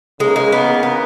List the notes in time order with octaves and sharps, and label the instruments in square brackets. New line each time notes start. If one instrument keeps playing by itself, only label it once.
[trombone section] C#3 E3 A#3 D#4 A#4 [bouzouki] G#3
[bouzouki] G#3
B3
B3